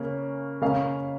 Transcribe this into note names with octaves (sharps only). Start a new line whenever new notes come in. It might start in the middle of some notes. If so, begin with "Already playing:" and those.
Already playing: C#3 A#3 C#4
C#3 A#3 C#4 F5